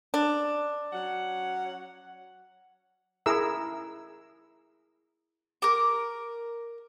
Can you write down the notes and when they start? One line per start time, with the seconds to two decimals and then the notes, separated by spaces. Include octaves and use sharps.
0.14 D4
0.93 F#3 C#4 F#5
3.26 E4 G#4 A#4 E6
5.62 A#4 D6